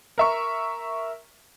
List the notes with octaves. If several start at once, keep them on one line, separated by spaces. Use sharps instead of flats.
A#4 E5 C#6